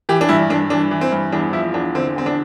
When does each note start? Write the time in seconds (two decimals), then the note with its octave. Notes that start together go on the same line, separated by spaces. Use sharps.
0.09 E3 G4
0.21 D4
0.29 G2 E4
0.50 G2 D4
0.70 E3 D4
0.91 E3
1.01 C4
1.12 G2
1.32 E2 D4
1.53 F3 E4
1.74 E2 D4
1.95 D3 C4
2.16 E2 C4
2.26 D4